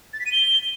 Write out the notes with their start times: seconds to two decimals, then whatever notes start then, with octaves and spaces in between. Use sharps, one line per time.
0.13 A6
0.19 B6
0.26 D#7
0.32 G7